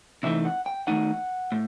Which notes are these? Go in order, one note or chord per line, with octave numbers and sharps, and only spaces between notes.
C3 E3 A3 D#4 E5
F#5
G5
D#3 A3 D#4 F#5
A2